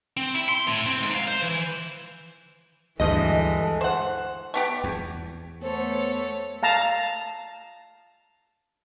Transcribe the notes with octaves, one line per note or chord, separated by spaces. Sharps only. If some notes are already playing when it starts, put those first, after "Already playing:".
C4
E4
C6
A2
C4
G#2
F5
C5
E3
D2 G2 E3 G#3 A4 D#5
C5 F#5
A3 B3 G4
E2
A3 B3 A4 C5 C#5
F5 A5 A#5